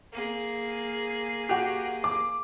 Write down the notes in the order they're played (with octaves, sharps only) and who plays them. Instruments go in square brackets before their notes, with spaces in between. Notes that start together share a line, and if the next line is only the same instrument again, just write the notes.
[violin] A#3 G#4
[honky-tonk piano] F#4 G4
D6